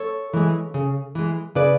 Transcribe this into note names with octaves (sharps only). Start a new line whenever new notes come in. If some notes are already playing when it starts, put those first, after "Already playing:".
Already playing: A4 C#5
E3 G#3
C#3
E3 G#3
C#3 B4 D5